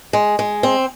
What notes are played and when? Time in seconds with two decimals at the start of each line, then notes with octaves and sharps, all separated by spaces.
0.13 G#3
0.39 G#3
0.63 C4